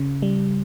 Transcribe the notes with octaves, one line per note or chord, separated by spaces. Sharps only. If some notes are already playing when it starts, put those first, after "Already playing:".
Already playing: C#3
G3